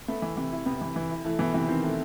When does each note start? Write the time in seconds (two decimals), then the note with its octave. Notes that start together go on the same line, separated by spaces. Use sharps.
0.08 A3 B3
0.22 E3
0.37 C3 E3
0.52 E4
0.66 C3 B3
0.81 E3
0.96 E3
1.11 E4
1.24 E3 A3
1.39 B2 E3
1.54 C3 E3
1.68 D#3 C4
1.83 A3